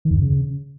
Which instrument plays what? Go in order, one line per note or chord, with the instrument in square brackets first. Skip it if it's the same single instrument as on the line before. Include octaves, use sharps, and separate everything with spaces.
[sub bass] D#3
E2
F#2
C#3